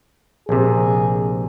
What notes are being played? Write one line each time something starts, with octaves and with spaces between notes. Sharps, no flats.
A#1 C3 G#4